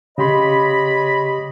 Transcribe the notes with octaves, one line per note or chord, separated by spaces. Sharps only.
C#3 G4 C#5 D#5 B5 C6